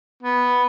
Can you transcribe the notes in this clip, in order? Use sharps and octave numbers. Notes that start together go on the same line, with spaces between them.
B3